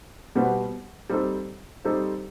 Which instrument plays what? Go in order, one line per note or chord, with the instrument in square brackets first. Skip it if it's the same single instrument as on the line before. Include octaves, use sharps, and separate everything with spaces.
[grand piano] B2 G3 B3 F#4 C5
G3 C4 D#4 A4 C5
G3 C4 D#4 A4 C5